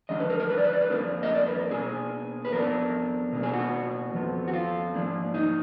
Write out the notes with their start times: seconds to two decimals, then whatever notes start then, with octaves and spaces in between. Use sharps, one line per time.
0.09 D3 F3 G#3 D4 D#5
0.20 B4
0.30 A#4
0.40 A#4
0.50 B4
0.57 D5
0.65 B4
0.74 D5
0.82 B4
0.90 F2 F3 A#3 D4 A#4
1.23 D#5
1.35 D5
1.46 B4
1.59 A#4
1.70 B2 A#3 D4 G#4
2.45 B4
2.52 F2 F3 B3 D4 A#4
3.33 B2 A#3 D4
3.43 G#4
3.53 F#4
4.14 F2 F3 B3
4.48 F#4
4.53 F4
4.94 G#2 F3 A#3 D4
5.34 D#4